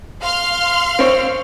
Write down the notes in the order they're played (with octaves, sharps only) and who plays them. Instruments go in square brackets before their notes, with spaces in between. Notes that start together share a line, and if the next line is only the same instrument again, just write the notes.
[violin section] F5 C6 F6
[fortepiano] C4 C#5